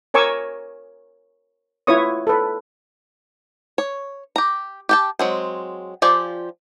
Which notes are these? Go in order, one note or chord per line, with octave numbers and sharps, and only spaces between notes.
A#4 C#5 G#5 C#6 D6 E6
E4 F4 B4 C#5 C#6 D#6
A4 B4
C#5
G4 A#5
G4 G5 A5
F#3 G#3 C4
F3 F4 G4 D5 G#5